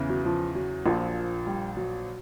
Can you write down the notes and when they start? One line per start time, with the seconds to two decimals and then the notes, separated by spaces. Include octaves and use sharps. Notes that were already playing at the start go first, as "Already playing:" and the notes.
Already playing: E2 C#3 E3
0.09 F#3
0.25 F3
0.55 F#3
0.86 A#1 A#2 F3
1.47 G3
1.77 F#3